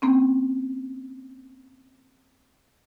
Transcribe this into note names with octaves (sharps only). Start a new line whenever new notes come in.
A#3 C4 C#4